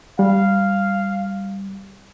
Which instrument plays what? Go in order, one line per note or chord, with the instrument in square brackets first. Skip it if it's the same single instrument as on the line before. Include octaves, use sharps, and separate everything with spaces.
[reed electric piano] G3 [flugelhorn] F5